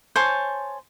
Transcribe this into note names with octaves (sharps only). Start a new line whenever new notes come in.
C5 C#5 G#5 A5